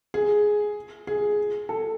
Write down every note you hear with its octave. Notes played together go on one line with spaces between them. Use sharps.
G#4
G#4
A4